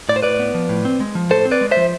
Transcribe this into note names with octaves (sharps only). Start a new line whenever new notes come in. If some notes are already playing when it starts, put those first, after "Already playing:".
A2 D5
C5
A2 B4 D5
B3
F3
A2
C4
G#3
F3
A2 A4 C5
C4
B4 D5
G#3
C5 E5
F3